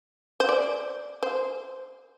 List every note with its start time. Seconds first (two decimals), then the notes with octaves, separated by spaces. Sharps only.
0.40 C5
0.49 D5
1.23 C5